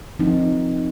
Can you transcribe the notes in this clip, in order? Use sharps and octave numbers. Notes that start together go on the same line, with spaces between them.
F3 C4 D#4